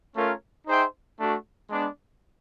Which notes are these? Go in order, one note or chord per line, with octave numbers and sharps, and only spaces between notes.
A3 C#4 F4 A#4 C#5
D#4 G#4 C5 E5 G5
A3 D4 F#4
G#3 B3 D4